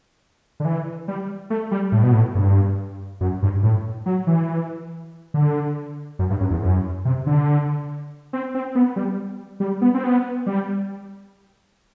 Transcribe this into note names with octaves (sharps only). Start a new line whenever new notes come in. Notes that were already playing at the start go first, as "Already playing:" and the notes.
D3
E3
G3
A3
G3
A2
B2
A2
G2
F#2
G2
A2
F#3
E3
D3
F#2
G2
F#2
E2
F#2
C3
D3
C4
C4
B3
G3
G3
B3
C4
B3
G3